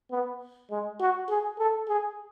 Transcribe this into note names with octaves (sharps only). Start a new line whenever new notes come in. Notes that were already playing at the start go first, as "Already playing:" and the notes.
B3
G#3
F#4
G#4
A4
G#4